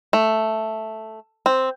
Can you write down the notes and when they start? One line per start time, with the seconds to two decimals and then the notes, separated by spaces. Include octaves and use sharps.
0.13 A3
1.46 C4